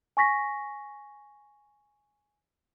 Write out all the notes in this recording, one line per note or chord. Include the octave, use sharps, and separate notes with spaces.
G#5 C#6 A#6 B6